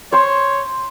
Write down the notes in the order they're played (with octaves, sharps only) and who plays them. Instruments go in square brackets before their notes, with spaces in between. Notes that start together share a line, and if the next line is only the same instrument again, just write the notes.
[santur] C5 C6 [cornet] C#5